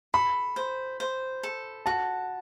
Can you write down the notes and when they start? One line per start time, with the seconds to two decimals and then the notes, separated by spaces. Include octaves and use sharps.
0.14 A4 B5
0.56 C5
1.00 C5
1.43 A4
1.86 F#4 A5